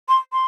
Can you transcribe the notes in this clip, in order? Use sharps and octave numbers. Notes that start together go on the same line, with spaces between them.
C6
C6